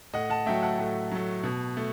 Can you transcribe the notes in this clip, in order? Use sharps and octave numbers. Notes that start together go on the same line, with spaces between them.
A2 D#5 F#5
F#5 A5
F#3 A3 E5 G5
F#5 A5
A2
F#3 A3
B2
A3